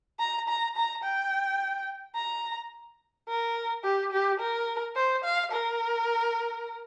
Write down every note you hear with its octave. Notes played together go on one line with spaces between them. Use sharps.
A#5
A#5
A#5
G5
A#5
A#4
G4
G4
A#4
C5
F5
A#4